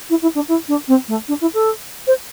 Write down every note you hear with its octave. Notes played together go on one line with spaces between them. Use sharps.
E4
E4
D4
E4
D4
C4
A3
D4
E4
A4
C5